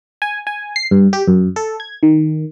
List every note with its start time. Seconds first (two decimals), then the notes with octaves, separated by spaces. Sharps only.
0.22 G#5
0.47 G#5
0.76 C7
0.91 G2
1.13 G4
1.28 F#2
1.56 A4
1.80 G#6
2.03 D#3